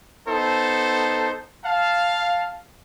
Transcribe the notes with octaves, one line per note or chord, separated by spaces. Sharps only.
B3 D#4 A4 C5
F5 A5